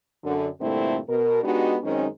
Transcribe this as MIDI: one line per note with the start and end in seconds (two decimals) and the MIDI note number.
0.24 0.48 42
0.24 0.48 50
0.61 0.98 43
0.61 0.98 46
0.61 0.98 50
0.61 0.98 57
0.61 0.98 60
0.61 0.98 64
1.08 1.43 47
1.08 1.43 70
1.43 1.77 56
1.43 1.77 59
1.43 1.77 62
1.43 1.77 63
1.43 1.77 66
1.43 1.77 67
1.83 2.06 42
1.83 2.06 51
1.83 2.06 56
1.83 2.06 60
1.83 2.06 61
1.83 2.06 63